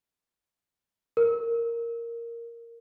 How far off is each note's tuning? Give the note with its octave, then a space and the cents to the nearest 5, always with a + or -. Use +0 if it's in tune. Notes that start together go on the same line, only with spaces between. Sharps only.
A#4 -5